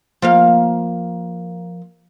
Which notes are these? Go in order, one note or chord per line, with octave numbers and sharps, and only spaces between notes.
F3 A#3 F5